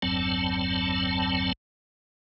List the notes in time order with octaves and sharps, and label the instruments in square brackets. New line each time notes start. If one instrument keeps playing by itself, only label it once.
[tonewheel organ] G1 E2 G2 F#3 C4 A5